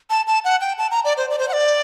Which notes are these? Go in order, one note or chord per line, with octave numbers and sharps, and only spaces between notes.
A5
A5
F#5
G5
A5
A#5
D5
C5
D5
C5
F#5
D5